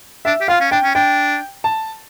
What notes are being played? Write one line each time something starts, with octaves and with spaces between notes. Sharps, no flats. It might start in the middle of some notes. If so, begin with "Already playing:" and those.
D4 E5
G4
F4 F5
C#4
D4 G5
C#4
D4 G5
A5